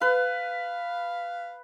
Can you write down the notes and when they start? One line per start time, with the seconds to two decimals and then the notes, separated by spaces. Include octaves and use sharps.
0.01 B4 F5